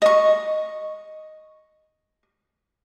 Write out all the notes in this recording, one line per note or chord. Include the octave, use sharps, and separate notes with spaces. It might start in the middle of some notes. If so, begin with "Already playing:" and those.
D#5 C#6